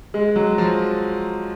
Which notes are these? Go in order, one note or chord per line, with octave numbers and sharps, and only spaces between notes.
G#3
F#3
F3